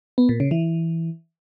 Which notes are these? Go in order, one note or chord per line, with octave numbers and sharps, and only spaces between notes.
B3
A#2
C#3
E3